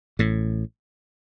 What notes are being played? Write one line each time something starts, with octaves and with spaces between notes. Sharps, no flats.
A1 A2